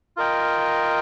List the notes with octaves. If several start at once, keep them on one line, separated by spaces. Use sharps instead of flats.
F4 A#4 D#5 G5